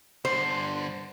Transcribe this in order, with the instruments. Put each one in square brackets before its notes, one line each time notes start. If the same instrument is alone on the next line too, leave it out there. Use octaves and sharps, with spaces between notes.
[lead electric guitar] G2 D3 [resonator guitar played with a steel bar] C5